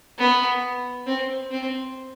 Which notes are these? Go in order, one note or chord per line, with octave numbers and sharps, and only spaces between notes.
B3
C4
C4